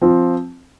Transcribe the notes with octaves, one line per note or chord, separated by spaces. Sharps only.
F3 C4 F4